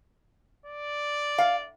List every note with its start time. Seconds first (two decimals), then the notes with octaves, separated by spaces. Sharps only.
0.66 D5
1.38 F5